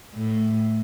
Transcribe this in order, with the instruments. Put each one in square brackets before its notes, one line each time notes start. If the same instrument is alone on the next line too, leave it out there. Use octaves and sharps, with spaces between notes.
[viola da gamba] A2